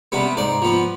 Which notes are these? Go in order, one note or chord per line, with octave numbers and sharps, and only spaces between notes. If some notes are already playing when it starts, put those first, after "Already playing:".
C3 G3 B3
G#2 D5
F3 B3